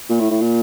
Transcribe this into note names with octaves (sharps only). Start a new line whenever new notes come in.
A#2
A2
A2
A#2